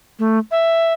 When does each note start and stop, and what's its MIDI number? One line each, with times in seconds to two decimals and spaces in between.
0.19 0.39 57
0.51 0.93 76